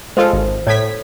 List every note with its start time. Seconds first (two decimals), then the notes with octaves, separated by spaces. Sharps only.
0.17 G#3 F4 A4 C5
0.33 G#1
0.67 A2 A4 C#5 G#6 B6